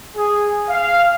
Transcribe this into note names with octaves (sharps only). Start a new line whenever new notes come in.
G#4
F5